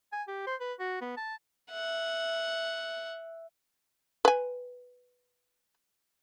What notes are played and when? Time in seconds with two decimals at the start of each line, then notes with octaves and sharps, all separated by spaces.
0.13 G#5
0.28 G4
0.47 C5
0.60 B4
0.79 F#4
1.01 B3
1.17 A5
1.71 E5 F#5
4.25 B4 G#5